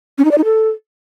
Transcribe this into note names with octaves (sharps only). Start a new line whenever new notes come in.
C#4
D#4
D5
D#4
A4